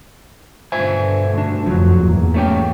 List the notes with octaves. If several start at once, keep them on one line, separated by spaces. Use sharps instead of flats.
G2 B2 D3 C5 E5 G#5
D2 D4
F1 F#2 F3 F#3
E2 G#2 A#3
A3 C#4 G4